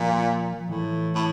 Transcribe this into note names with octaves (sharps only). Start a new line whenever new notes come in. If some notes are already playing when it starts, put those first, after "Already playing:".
Already playing: A#2 F3
A2 E3
A2